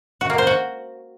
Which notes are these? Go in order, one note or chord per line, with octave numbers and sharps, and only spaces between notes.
F#4
A#3
C5
F#4